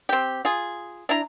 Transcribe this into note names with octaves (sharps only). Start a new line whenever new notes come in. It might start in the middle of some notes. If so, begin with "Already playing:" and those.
C4 G4
F4 G#4
D4 E4 A#5